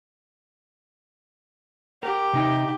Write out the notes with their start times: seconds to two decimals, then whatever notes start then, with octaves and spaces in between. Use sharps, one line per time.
2.03 G4 A#4
2.33 C3 D#4 G5